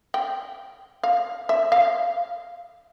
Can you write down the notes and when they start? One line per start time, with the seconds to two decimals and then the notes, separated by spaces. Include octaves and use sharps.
0.14 G5
1.03 F5
1.49 E5
1.72 F5